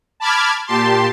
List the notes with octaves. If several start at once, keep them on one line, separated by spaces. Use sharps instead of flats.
A5 B5 D6 F6 G#6
A#2 G4 A5 C6